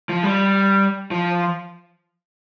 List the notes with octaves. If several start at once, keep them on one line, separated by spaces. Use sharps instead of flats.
F3
G3
F3